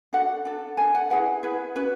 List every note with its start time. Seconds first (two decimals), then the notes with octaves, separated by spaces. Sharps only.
0.13 D4 F#4 A4 F#5
0.45 D4 A4
0.77 D4 A4 G#5
0.95 F#5
1.10 E4 G#4 B4 F#5
1.43 E4 G#4 B4
1.75 C#4 F#4 B4